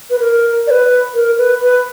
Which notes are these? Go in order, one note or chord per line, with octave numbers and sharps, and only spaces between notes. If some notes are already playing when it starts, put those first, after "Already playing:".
B4
A#4
D5
B4
A#4
B4
B4